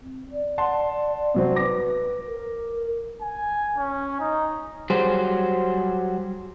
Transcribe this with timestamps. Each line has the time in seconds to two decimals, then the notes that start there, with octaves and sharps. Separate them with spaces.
0.02 C4
0.32 D5
0.58 F#5 A5 C6
1.34 C3 F#3 C4
1.56 B4 D6 A#6
2.27 A#4
3.21 G#5
3.78 C#4
4.20 D#4
4.90 F#3 G3 G#4 C5